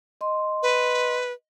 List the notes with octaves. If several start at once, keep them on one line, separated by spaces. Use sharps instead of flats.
D#5 C6
B4